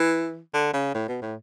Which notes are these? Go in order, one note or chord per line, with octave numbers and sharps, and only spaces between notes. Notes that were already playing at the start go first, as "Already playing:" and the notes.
Already playing: E3
D3
C#3
A2
B2
A2